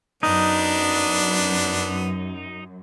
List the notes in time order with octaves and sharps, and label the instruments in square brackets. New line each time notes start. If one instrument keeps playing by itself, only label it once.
[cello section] F#2 [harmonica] B3 D4 [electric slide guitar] D#4